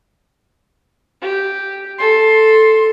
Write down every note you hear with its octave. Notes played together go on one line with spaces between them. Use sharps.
G4
A4 C6